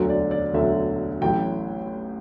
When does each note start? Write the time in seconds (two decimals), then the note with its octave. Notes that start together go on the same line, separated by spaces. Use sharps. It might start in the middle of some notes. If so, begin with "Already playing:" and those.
Already playing: E1 D2 D3 F#3
0.09 D5
0.31 D5
0.54 E1 D2 D3 F#3 E5
1.21 A1 A2 F#3 G5